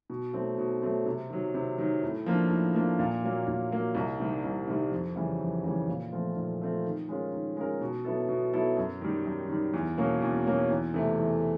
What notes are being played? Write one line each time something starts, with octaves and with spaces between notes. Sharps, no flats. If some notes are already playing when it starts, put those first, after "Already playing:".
B2
F#3 A3 C4
B2
F#3 A3 C4
C3
D#3 F#3
C3
D#3 F#3
A2
F3 A#3 D4
A2
F3 A#3 D4
A#2
F#3 A#3
A#2
F#3 A#3
C2
C3 D#3 G3
C2
C3 D#3 G3
F2
C#3 E3 G3
F2
C#3 E3 G3
A#2
F3 A3 C4 F4
A#2
F3 A3 C4 F4
D#3
G#3 C#4 F4 A#4
D#3
G#3 C#4 F4 A#4
B2
F#3 B3 E4 A4
B2
F#3 B3 E4 A4
F#2
D#3 G3
F#2
D#3 G3
E2
B2 F#3 A#3 C#4
E2
B2 F#3 A#3 C#4
E2
C3 E3 A3
E2